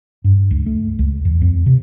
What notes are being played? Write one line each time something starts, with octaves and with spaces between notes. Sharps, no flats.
G2
C#2
A3
C#2
E2
F2
C3